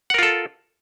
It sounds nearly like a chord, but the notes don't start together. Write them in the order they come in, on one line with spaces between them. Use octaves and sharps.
F#5 A#4 F4 A4